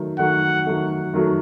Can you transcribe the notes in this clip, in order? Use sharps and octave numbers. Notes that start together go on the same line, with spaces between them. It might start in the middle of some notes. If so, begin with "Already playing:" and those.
Already playing: D#3 F#3 A3
D#3 F#3 A3 F#5
D#3 F#3 A3
D#3 F#3 A3